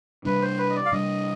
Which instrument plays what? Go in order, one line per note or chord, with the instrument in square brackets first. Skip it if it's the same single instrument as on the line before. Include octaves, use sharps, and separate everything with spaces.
[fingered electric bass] C3 G3 D4 [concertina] B4
[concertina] C5
B4
D#5
D5
F5
[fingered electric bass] C3 G3 D4 [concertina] D#5